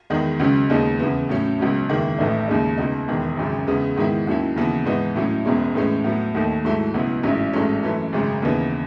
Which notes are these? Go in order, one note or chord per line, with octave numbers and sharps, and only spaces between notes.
E2 D#3 G#3 D#4
C#2 C#3 F#3 C#4
D#2 C#3 G#3 B3 D#4
E2 C#3 E3 B3
A2 F#3 C#4
C#2 B2 F#3 C#4
F#1 E2 D#3 G#3
A1 A2 E3 A3 D#4
D#2 C#3 G#3 D#4
C#2 B2 G#3 D#4
E1 E2 D#3
G#1 F#2 C#3
E2 C#3 G#3 B3
G#2 D#3 G#3 B3 E4
D#2 D#3 F#3 C#4 E4
D#2 C#3 E3 B3
G#2 E3 B3 D#4
A2 F#3 C#4 E4
E1 E2 B2 G#3 C#4
A2 E3 G#3 C#4
A2 F#3 B3
D#2 D#3 A3
G#2 F#3 A3 E4
C#2 B2 F#3 B3 E4
A1 G#2 F#3 C#4 E4
A1 G#2 F#3 A3 C#4
F#2 E3 A3
G#1 F#2 C#3 G#3
D#2 C#3 E3 B3 D#4